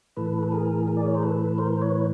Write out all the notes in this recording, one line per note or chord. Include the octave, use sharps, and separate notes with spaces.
A2 E3 A4 B4
A4
G#4 A#4
G#4 A#4
D5
C#5
C5
A4 B4
A#4 C5
B4 C#5